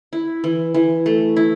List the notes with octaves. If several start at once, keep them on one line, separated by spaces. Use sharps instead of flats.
E4
E3
E3
A3
E4